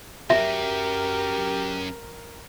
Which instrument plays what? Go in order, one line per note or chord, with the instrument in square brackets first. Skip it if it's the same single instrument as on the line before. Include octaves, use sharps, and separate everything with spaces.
[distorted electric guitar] C#2 F#2 [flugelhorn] G4 [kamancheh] A#4 [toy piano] E5